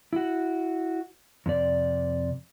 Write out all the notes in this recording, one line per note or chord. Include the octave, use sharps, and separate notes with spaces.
E4 F#4
F2 C3 D5